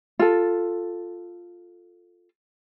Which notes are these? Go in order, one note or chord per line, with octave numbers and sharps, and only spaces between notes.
F4 A4